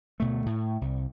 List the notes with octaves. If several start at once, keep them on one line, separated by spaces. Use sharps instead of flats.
D2 B2 A3
A2
C2